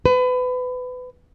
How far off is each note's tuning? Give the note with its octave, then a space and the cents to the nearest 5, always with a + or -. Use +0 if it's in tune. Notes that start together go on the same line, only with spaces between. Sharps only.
B4 +25